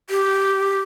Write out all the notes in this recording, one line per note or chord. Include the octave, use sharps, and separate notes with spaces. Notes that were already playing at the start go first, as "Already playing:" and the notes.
G4